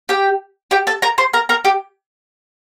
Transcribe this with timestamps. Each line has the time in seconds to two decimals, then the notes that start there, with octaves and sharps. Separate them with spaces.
0.09 G4 G5
0.71 G4 G5
0.87 A4 A5
1.02 A#4 A#5
1.18 C5 C6
1.33 A#4 A#5
1.49 A#4 A#5
1.65 G4 G5